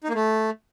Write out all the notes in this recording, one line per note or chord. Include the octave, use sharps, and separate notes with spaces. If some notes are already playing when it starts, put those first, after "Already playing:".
D#4
A#3
A3